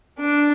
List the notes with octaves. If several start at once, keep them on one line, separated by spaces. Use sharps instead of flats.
D4